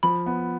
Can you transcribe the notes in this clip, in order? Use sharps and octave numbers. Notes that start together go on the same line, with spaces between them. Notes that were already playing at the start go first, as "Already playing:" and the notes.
F3 B5
B3